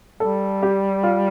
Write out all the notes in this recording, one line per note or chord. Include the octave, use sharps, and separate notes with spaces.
G3 A4
G4
F4